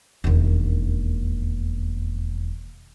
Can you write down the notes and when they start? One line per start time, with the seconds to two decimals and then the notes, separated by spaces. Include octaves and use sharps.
0.24 E1 D#2